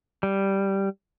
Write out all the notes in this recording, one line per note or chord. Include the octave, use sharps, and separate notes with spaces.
G3